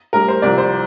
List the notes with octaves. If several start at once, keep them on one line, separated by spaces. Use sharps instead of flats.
A2 G3 A#4
C5
C2 C3 F3 D5
C5